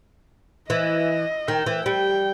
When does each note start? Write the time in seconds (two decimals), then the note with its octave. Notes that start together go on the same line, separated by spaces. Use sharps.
0.70 E3 D#5
1.48 D#3 G5
1.66 E3
1.86 G3 G5